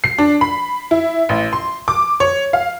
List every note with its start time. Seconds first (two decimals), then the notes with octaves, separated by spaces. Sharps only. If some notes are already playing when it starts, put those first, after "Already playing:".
0.04 C7
0.18 D4
0.41 B5
0.91 E4
1.29 A1
1.53 C6
1.88 D6
2.20 C#5
2.53 F5